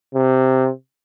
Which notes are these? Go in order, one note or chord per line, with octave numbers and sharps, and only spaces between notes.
C3